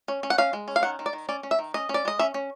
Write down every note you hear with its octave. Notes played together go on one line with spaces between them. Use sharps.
C#4
C#4
F#5
C#4 F5
G#3
C#4
F5
D#3 F#5
D#3
D5
D#3
C#4 D5
C#4
E5
D#3
C#4 D#5
C#4
D5
G#3 D#5
C#4 E5
C#4